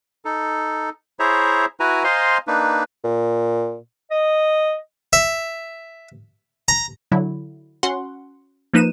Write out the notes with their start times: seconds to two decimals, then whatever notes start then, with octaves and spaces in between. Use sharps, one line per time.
0.25 D#4 A4
1.19 E4 G#4 C5 C#5 E5 A#5
1.80 E4 F#4 B4 G#5 A#5
2.04 C5 D#5 F5 G#5 A#5 C6
2.47 A#3 D4 D#4 B4
3.04 A#2
4.11 D#5
5.13 E5
6.68 A#5
7.12 D3 F#3 E4
7.83 C#4 F#4 F#5 C6
8.73 F3 A#3 D#4 B4 D#7 E7